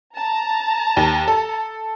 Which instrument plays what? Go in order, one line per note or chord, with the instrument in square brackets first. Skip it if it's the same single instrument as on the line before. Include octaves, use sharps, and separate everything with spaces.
[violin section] A5 A#5
[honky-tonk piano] D#2
A4